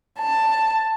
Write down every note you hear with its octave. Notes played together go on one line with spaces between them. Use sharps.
A5